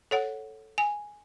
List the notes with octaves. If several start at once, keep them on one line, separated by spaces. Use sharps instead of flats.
A4 C#5 F#5
G#5